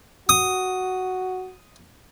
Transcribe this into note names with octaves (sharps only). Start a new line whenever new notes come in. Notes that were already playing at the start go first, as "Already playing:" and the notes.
F#4 D#6